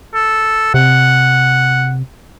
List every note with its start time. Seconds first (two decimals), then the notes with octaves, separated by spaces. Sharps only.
0.14 A4
0.74 C3 F#5